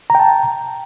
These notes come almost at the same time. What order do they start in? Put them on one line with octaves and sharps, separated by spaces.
A#5 G5 A5